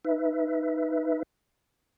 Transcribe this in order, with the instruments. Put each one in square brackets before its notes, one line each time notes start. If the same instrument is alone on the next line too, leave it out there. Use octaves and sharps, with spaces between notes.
[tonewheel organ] D#4 B4 E5